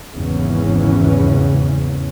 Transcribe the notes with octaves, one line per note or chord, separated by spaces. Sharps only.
G#1 E2 C#3 E3 C#4